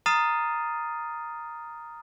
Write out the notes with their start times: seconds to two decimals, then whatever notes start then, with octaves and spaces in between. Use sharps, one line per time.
0.06 A#5 D#6 F6 A6 C7 D#7